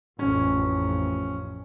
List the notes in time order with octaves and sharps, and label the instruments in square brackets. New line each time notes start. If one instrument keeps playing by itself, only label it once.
[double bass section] A1 F2 [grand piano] C#4